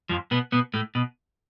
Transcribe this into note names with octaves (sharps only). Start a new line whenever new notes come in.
F2 F3
B2 B3
B2 B3
A2 A3
B2